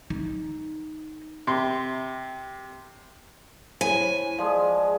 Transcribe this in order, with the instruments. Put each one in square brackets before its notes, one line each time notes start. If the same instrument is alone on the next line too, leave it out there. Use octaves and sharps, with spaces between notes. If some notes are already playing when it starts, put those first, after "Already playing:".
[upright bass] D#4
[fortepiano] C3 C6
[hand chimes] E4 C5 C#5 [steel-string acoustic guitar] G#5 [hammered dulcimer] B5
[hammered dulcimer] F3 G#3 [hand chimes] G#4 D5 F5